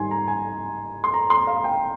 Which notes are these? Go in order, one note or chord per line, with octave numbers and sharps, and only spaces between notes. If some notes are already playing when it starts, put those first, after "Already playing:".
Already playing: G#2 D#3 G3 G#5 C6
A#5
G#5
C6
A#5
C6
F5
G5